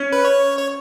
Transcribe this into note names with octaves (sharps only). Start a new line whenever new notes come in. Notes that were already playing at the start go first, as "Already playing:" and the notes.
Already playing: C#4
B4
C#5
C#5